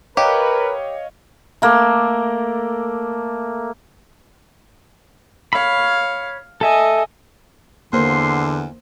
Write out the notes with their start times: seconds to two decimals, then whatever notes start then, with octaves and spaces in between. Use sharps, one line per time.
0.17 G4 A#4 B4 C#5 D#5 F5
1.62 A3 A#3
5.53 C#5 F5 B5
6.61 A4 D#5 E5 G#5
7.93 E2 D3 A#3 C5 C6